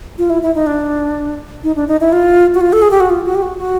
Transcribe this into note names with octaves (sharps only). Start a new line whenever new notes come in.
F4
E4
E4
D#4
D4
D#4
D4
D#4
E4
F4
F#4
F4
A4
G#4
G4
F#4
F4
F#4
G4
F#4
F#4